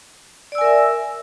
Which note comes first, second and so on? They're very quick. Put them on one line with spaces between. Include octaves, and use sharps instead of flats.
D5 E6 G#5 A#4 E5